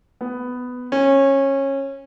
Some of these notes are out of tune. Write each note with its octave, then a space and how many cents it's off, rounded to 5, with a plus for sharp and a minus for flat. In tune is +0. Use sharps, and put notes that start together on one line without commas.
B3 +10
C#4 -20